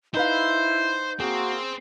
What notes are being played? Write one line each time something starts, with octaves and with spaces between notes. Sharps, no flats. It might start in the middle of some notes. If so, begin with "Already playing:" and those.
D#4 E4 B4 C5 F5 G6
A#3 C4 F#4 G#4